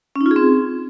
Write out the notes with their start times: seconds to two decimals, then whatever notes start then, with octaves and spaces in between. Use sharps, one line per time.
0.16 C#4
0.21 D#4
0.26 F4
0.31 G#4
0.36 C4